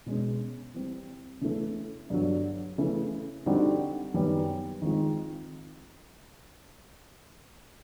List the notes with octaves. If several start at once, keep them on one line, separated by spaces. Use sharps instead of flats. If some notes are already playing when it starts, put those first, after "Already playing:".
B2 G#3 C#4
E3 G3 C4
C#3 E3 A3 C#4
G2 D3 F#3
C#3 E3 A3
D3 G3 C4 D#4 F#4
F#2 D#3 G3 B3
D#3 G#3 C4 F4